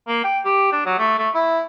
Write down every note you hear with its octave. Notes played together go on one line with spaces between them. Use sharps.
A#3
G5
G4
D4
F#3
A3
A3
E4